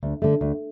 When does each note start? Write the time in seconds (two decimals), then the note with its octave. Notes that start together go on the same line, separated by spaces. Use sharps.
0.03 D2
0.22 D3 A3
0.41 D2